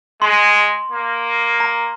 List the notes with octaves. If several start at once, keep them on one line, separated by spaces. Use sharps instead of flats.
G#3 C6
A#3
A#5